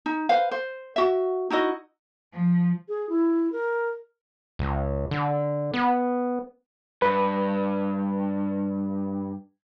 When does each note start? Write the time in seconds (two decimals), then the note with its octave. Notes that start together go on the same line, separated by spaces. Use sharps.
0.06 D#4
0.29 B4 C5 F5
0.51 C5
0.96 F#4 E5
1.50 D#4 E4 F#4 D#5
2.33 F3
2.89 G#4
3.09 E4
3.52 A#4
4.59 C#2
5.11 D3
5.74 B3
7.02 G2 B4